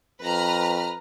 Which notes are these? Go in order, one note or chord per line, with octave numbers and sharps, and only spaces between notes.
F2 B4 A#5 F6